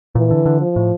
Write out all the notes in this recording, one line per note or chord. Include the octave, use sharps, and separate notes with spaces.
A#2 E3
D3
D3
F3
A2